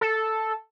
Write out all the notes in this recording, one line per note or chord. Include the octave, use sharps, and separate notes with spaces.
A4